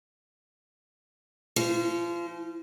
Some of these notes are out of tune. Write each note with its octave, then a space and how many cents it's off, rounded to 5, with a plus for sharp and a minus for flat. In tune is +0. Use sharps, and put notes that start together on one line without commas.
F3 -30